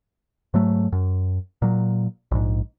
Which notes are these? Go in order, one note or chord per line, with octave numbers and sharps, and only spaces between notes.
G#2 F#3 A3
F#2
A#2 F#3
A#1 G#2